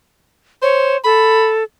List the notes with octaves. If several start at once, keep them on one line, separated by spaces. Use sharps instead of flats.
C5 C#5
A4 B5